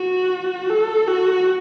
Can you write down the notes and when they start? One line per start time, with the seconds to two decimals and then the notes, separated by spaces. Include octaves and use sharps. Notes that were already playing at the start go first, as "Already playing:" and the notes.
Already playing: F#4
0.70 A4
1.08 F#4